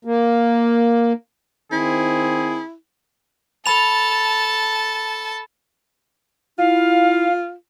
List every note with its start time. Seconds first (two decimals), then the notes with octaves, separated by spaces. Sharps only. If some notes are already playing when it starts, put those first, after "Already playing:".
0.05 A#3
1.72 D#3 C4 E4 G#4
3.66 A4 A5 B5 F7
6.59 E4 F4 F5